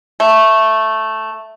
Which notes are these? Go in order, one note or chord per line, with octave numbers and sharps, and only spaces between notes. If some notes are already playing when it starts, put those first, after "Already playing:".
A3